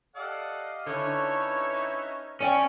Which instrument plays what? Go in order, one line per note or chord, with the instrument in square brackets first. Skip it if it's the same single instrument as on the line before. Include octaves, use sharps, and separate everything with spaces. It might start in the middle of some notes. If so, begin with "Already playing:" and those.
[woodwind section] G4 D#5 F5 [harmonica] A4 D5 F#5
[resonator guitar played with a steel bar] D3 [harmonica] C#4 D#4 E5 [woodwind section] E4 B4 C#5
[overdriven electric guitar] C#4 [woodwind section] F4 A4 C#6 [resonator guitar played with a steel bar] C#5 D5 G5